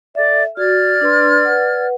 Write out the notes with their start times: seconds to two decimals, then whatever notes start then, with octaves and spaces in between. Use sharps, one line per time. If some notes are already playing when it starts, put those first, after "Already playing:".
0.15 A4 D5 E5
0.57 F#4 D5 F6 G#6
1.01 D4 B4 C6
1.45 B4 F#5